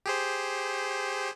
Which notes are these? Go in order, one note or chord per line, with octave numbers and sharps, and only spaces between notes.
G4 G#4 C5